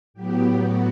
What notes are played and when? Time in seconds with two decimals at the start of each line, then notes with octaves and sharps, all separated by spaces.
0.14 A2 F#3 B3 G4
0.58 F#4